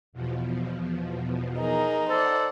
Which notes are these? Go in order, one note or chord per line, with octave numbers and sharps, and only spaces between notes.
E2 B2 F3
D#4 G#4 A#4
A4 C5 D5 F#5